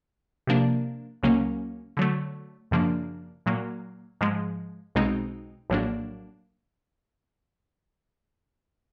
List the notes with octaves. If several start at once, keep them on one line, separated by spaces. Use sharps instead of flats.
C3 F3 A#3 D4
C#2 C#3 F#3 A#3 C#4
D3 F#3 A3
F#2 C#3 F3 A#3 D4
A#2 F#3 A#3
G#2 F3 G#3
B1 B2 G#3 C4 D#4
A#1 A2 F#3 A#3 D4